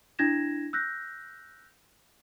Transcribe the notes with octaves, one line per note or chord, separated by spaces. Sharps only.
D4 E4 G#6 A#6 E7
E6 F#6 G6 A#6 B6